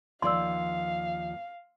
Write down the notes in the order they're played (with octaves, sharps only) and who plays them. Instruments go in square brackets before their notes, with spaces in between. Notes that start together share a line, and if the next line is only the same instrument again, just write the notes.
[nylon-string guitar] D#2 F3 D5 [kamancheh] F5 [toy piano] C6 E6